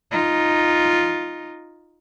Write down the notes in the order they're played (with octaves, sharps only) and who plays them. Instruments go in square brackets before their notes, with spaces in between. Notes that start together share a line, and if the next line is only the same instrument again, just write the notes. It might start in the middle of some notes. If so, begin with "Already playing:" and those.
[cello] D#4 F4